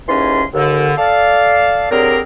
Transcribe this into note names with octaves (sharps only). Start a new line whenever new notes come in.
D#2 G#2 E3 C#4 C6
D#2 D3
A4 D5 F5
D3 F#3 G3 C4 G#4 A#4